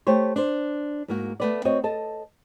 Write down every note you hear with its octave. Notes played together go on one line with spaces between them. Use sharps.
A3 G4 C5 C#5
D4 C5
G#2 A#3 F#4
A3 B3 D5
C4 F#4 C#5 D#5
A4 D#5 A5